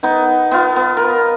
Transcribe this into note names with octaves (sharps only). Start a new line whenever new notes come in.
B3 D#4
B3 F4
B3
A#4 B4